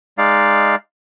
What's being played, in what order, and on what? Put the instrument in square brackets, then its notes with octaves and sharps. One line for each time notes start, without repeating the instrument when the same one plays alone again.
[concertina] G#3 D#4 D5 F5